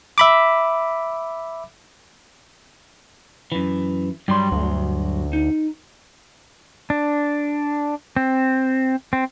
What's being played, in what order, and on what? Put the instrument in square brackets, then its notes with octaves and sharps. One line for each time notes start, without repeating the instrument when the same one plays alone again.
[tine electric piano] E5 B5 D6
[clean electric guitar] F#2 E3
[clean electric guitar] G2 F#3 C6 [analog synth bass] G3
[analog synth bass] D2
[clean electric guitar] D#4
[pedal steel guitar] D4
C4
C4